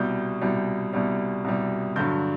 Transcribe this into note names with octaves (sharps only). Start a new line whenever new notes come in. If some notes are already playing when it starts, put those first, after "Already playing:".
Already playing: C2 B2 G3 G6
C2 B2 G3
C2 B2 G3
C2 B2 G3
G2 D3 F#3 G6